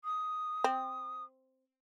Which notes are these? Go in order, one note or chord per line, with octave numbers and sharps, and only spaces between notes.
D#6
C4